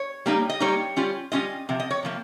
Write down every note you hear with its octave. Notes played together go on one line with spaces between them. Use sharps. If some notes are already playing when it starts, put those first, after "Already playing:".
Already playing: C#5
G3 A#3 D#4
D#5
G3 A#3 D#4 C#5
G3 C#4 F4
G3 C#4 F4 D#5
C3 F3
D#5
C#5
C3 F3 A#3